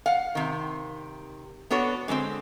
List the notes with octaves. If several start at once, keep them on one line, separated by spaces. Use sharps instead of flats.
F5 F#5
C3 D#3
B3 D4 F#4 A4 C#5
D3 G#3 A#3 C4